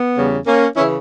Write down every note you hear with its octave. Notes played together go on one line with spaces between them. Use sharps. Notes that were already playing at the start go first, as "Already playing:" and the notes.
Already playing: B3
E2 C#3 G3
A#3 C#4
C#3 E3 C#4 E4